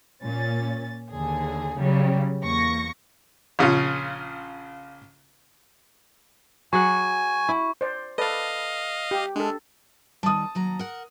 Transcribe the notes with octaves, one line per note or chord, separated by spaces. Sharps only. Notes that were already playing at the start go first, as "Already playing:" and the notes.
A#2 C#4 A6
D#2 D3 G#4
C#3 F#3 G3
E2 A#3 C#6 A#6 C#7
A#1 C#3 C#4 F4
F#3 G#4 F#5 G#5 C#6
E4
C5 D5
A4 B4 D5 D#5 F5
G4
G#3 D4 A4
D#3 G3 A5 D#6
D#2 F#3 A#5
A#4 F#5